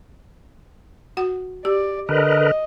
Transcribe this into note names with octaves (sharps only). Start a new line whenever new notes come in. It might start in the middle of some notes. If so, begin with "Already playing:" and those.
F#4 F#5
G4 D5
D3 A#4 B4 D#5